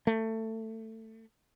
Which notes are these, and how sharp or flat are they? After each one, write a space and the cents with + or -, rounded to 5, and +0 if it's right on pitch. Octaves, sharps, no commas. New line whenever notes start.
A3 +20